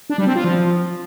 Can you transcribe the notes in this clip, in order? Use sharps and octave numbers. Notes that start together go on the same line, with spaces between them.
D4
G3
C4
F4
F3